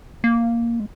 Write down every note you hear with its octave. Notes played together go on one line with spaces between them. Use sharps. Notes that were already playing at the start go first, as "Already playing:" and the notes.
A#3
G#3